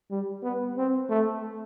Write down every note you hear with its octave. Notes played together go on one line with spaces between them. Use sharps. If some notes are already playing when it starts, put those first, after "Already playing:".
G3
B3
C4
A3